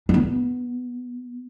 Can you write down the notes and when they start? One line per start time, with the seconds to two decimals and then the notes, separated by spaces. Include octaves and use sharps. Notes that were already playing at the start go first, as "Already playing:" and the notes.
0.09 D4
0.14 B3